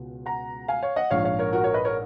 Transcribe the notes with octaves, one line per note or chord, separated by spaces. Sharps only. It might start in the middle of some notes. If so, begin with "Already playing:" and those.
Already playing: C#2 B2 G#3
F#5 A#5
F5 G#5
C#5 F5
D#5 F#5
A#1 G#2 F3 C#5 F5
C#5 F5
A#4 C#5
F#4 A#4
A#4 C#5
B4 D#5
A#4 C#5